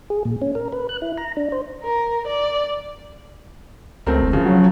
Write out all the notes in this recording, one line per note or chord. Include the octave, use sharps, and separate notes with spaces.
G#4
A#2
C#4
A#4
B4
F#6
E4
A#5
D4
C5
A#4
D5
C#2 A3 C4 A#4
E1
C#3 F3
F#3